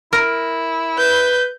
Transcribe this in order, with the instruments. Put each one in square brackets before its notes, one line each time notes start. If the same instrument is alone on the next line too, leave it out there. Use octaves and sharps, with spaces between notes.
[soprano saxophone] E4 [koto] A#4
[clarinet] B4 [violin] G6